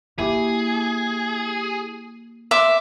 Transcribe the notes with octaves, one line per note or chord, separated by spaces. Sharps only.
A#3 E4 G4 G#4
E5 C6 D6